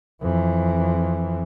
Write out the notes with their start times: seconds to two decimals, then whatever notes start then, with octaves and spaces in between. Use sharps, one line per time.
0.22 F2 E3